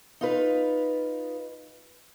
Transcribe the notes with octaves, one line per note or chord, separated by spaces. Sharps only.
D#4 F4 B4